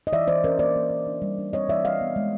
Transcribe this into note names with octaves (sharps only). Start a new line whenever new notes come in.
D#5
E3 D5 E5
E3 C5 D5
C#4 A#4 C5
A#3 C5 D5
A#3
A#3
D4
G3
D4
C4 C#5 D#5
E3 D5 E5
G3 D#5 F5
B3
G#3